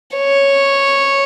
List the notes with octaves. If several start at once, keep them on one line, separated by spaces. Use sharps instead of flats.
C#5